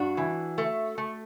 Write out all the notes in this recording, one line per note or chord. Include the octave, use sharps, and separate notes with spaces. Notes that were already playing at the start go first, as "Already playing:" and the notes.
Already playing: G2 D4 F#4
E3
A3
A3